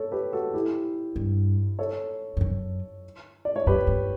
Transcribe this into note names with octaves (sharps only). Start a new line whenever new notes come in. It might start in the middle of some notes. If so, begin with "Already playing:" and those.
Already playing: A4 C#5
G4 B4
F#4 A4
E4 G4
G2
A4 C#5
G2
F#2
D5
C#5
F#2 G4 B4
G2